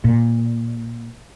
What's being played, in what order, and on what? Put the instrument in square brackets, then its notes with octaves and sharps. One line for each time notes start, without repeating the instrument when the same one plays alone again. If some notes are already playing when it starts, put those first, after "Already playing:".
[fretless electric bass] A#2